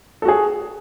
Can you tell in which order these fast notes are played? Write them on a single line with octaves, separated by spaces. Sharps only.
A4 F#4 G#4